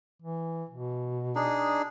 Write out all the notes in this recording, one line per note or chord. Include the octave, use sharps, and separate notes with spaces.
E3
B2
D4 D#4 G#4